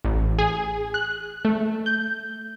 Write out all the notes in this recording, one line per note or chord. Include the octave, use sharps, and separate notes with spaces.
A1
G#4
F#6
A3
G6